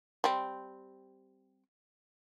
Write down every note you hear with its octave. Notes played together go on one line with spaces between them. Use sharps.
G3 C4